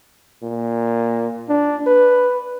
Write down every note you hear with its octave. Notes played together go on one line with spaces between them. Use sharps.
A#2
D4
B4